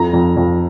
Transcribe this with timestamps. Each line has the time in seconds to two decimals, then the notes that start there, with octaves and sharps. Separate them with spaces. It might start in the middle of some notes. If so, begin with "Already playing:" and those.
Already playing: F2 A#5
0.13 F2
0.37 F2